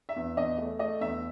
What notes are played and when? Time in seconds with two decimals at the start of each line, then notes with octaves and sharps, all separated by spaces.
0.09 E5
0.16 E2
0.37 E2 D#5
0.58 A3
0.79 A3 D#5
1.01 E2 E5